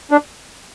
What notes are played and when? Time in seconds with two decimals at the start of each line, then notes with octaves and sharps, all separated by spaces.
0.11 D4